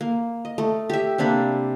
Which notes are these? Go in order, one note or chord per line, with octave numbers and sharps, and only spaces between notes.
A#3
D#5
A3
G4 E5
C3 A#3 D4 B5